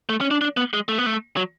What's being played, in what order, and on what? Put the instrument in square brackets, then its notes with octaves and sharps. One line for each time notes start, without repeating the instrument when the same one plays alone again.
[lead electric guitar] A3
C#4
D4
D4
B3
G#3
A3
B3
A3
F#3